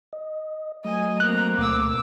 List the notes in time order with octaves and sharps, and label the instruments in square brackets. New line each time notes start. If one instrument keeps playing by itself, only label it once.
[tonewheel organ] D#5
[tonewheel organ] F#3 A3 [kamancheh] D#5 G#5
[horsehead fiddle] A#3 C4 [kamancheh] A#5 [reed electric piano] F#6
[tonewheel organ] D2 B2 A3 [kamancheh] D6 E6